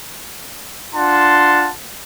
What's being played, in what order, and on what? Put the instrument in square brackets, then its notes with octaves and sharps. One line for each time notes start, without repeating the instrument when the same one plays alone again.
[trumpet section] D4 F4 F#5 A5 C6